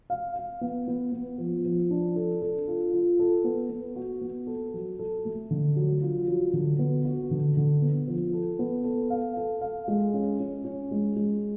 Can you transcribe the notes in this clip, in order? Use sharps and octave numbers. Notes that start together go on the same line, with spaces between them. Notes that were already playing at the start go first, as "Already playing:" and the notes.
F5
F5
B3
B3
B3
F3
F3
D4
A4
A4
F4
F4
A4
B3
B3
F#4
B3
A4
F#3
A4
A3
D3
F#3
F4
F#3
D3
B3
F#4
D3
D3
B3
F3
A4
B3
A4
F5
A4
F5
G#3
C#4
C#4
C#4
G#3
G#3